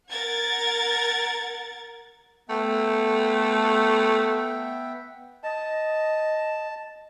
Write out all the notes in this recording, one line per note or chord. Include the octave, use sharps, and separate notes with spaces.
A#4 F#5 G#6 A6
A3 B3 E5 G5
D#5 A5